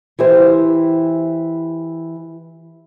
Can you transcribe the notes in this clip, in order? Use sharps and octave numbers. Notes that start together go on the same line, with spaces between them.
E3 E4 G4 C5